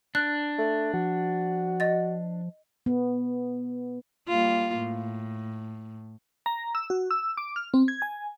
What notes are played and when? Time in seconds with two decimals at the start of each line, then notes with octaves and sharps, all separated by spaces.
0.15 D4 F#6
0.58 A3
0.94 F3 F#4
1.80 D#5 A6
2.86 B3
4.28 G3 A#3 F4
4.78 A2
6.46 A#5
6.75 E6
6.90 F#4
7.11 E6
7.37 D6
7.56 F6
7.74 C4
7.88 G#6
8.02 G#5